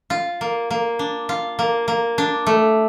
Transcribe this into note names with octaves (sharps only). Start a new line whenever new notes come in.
F4
A#3
A#3
D4
F4
A#3
A#3
D4
A3